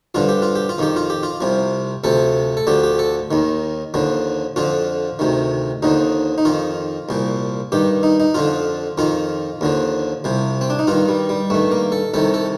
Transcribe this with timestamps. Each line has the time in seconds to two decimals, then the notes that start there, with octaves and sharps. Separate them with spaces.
0.15 G2 D3 F3 F4
0.29 G4
0.42 F4
0.55 G4
0.69 F4
0.78 F2 D#3 G4
0.96 F4
1.10 G4
1.23 F4
1.41 C2 C3 F3
2.04 D2 C3 F3 A4
2.57 A4
2.67 D2 D3 F3 G4
2.83 G4
2.99 A4
3.31 D#2 D#3
3.94 D#2 D3 F3
4.56 F2 D3 F3 F4
5.19 D2 C3 D#3
5.83 D#2 D3 F3 D#4
6.38 D#4
6.45 F2 D#3 F4
7.09 C2 A#2 F3
7.72 G2 D#3 G4
8.03 D#4
8.20 D#4
8.34 F2 D3 F3 F4
8.98 F2 D#3 F4
9.61 D#2 D3 F3
10.24 C2 C3 F3
10.61 C4
10.70 D4
10.79 D#4
10.87 G2 D#3 F4
11.08 G3
11.29 G3
11.50 G2 D#3 A3
11.72 A#3
11.92 A4
12.14 C2 C3 D#3 A4
12.34 A4